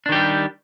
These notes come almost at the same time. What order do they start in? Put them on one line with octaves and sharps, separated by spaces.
D4 D#3 G4 G3